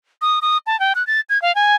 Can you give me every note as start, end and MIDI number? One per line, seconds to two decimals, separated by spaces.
0.22 0.39 87
0.42 0.58 87
0.67 0.79 81
0.80 0.93 79
0.95 1.05 90
1.07 1.21 93
1.29 1.41 92
1.42 1.54 77
1.55 1.76 80